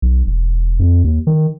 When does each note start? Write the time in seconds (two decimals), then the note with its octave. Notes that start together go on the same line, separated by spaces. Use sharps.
0.02 B1
0.27 E1
0.80 F2
1.04 D#2
1.27 D#3